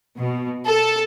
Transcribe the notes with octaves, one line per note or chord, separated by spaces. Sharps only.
B2
A4